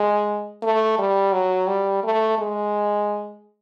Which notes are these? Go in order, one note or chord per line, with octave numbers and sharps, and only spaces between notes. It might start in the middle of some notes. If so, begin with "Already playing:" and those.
Already playing: G#3
A3
G3
F#3
G3
A3
G#3